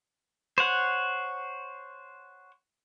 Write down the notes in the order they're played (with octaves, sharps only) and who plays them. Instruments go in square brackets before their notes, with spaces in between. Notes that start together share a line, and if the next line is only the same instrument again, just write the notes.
[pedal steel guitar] C5 C#5 F#5